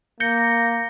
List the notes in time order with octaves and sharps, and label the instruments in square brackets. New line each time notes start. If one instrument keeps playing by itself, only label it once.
[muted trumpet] A#3 [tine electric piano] G6 C#7 [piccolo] A#6